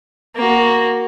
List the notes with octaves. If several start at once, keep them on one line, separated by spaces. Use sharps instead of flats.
A#3 F#4